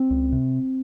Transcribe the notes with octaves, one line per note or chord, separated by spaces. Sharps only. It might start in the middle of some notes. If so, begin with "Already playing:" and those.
Already playing: C4
C#2
C3